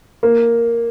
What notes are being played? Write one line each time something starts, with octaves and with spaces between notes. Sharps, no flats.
A#3